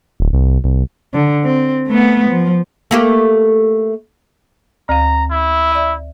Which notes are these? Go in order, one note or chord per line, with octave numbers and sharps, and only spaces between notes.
D1
C2
C2
D3
C4
A3 B3
F3
A3 A#3 G4
D2 F5 A#5
E4
D5 E5